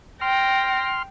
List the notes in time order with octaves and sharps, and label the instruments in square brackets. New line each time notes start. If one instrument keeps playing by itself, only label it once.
[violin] G5 A#6 [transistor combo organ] C6 F6